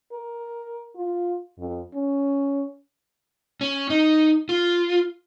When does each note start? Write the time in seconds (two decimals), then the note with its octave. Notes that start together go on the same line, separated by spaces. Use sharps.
0.12 A#4
0.96 F4
1.58 F2
1.94 C#4
3.61 C#4
3.90 D#4
4.49 F4